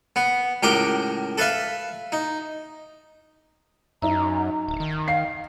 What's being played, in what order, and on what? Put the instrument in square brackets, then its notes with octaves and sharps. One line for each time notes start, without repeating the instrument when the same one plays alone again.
[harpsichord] B3
C#2 A2 G4 A#4 G5 D#6
A4 B4 E5 F5
D#4
[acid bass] F#2 [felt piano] D#4 E5 [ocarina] A#5
[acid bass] D1
D#3
[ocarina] F5 [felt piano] C7